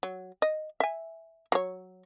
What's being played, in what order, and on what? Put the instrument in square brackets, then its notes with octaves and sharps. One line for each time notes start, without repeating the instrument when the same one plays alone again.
[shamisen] F#3
D#5
E5 G#5
F#3 C#5